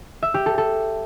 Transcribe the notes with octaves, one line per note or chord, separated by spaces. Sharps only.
E5
G4
A4
A4